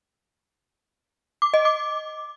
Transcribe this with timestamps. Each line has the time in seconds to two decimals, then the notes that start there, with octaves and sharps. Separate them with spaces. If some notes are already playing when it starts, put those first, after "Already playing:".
1.42 D6
1.54 D#5
1.65 D6